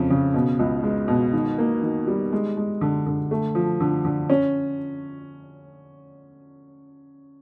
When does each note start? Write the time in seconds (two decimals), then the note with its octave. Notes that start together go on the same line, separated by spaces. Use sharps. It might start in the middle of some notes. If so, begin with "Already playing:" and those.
Already playing: F2 C#3
0.10 C#3
0.34 B2
0.59 C#2
0.83 G#3
1.08 B2
1.33 D#3
1.58 A#3
1.82 D#3
2.07 G3
2.32 G#3
2.57 G#3
2.81 D3
3.06 D3
3.31 A3
3.55 F3
3.80 D3
4.05 D3
4.30 C#4